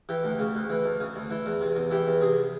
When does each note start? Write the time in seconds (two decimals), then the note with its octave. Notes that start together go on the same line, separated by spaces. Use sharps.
0.09 E3 G4
0.24 D2
0.39 C#3
0.55 D2
0.70 E3
0.84 D2
1.00 C#3
1.16 D2
1.31 E3
1.46 E2
1.61 C3
1.75 E2
1.91 E3 G4
2.07 E2
2.21 C3 G#4